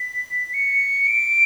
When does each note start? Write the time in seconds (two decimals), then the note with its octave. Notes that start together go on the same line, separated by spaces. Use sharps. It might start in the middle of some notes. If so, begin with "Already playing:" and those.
Already playing: B6
0.54 C#7
1.07 D7